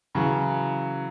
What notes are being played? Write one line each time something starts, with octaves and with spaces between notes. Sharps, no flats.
C#3 E3 F#3